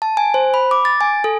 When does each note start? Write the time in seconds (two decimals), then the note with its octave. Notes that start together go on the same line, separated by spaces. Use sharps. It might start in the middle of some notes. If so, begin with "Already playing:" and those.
0.02 A5
0.17 G#5
0.34 C5
0.54 B5
0.71 D6
0.85 A6
1.01 G#5
1.24 A4